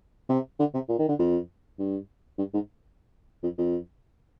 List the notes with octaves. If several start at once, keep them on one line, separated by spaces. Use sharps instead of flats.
C3
D3
C3
A#2
D#3
D3
F2
G2
G2
G#2
F2
F2